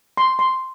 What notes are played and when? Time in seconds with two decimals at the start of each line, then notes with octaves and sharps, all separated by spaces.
0.17 C6
0.39 C6